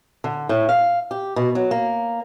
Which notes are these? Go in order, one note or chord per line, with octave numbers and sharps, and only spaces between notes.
D3
A2
F5
G4
B2
F#3
A#3